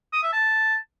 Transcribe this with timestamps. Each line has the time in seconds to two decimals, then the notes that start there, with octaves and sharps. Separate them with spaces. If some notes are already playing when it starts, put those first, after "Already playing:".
0.13 D#6
0.23 E5
0.33 A5